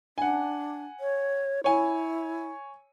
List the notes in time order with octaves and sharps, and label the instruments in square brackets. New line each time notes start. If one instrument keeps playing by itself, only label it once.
[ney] D4 [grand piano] F#5 G#5
[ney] C#5
[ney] E4 [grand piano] C#5 G#5